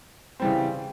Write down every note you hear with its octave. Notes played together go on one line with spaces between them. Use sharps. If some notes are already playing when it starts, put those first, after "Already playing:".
C#3 E3 G3 C4